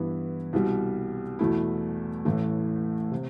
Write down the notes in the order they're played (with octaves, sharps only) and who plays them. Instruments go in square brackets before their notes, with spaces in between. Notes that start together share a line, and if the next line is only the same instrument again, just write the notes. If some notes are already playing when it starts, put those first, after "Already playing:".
Already playing: [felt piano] G2 E3 B3 E4
C2 B2 G3
E2 B2 A3 E4
A1 A2 E3 A3
C3